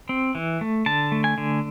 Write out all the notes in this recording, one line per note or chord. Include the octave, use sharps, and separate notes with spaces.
C4
E3
A3
D3 A5
A3
G#5
D3